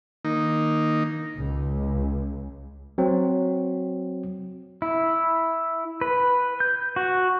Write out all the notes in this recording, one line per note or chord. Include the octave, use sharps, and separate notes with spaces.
D#3 A#3 D#4
C#2
F#3 C4
E4
B4
G6
F#4